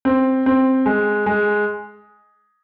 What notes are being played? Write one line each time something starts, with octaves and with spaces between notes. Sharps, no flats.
C4
C4
G#3
G#3